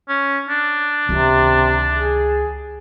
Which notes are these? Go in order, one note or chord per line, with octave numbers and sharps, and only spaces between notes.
C#4
D4
C#2 C3 D#3
G#4